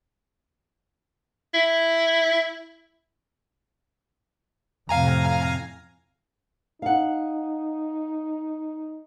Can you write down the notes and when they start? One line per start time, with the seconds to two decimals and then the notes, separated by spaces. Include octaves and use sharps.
1.54 E4
4.89 F2 A2 C3 F5 G#5 A#5
6.82 D#4 F5 F#5